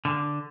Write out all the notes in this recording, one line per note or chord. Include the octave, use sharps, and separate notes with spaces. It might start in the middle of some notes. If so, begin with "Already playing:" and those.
D3